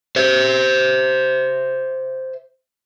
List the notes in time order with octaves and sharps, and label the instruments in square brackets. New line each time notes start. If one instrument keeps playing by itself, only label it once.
[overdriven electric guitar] C5 E5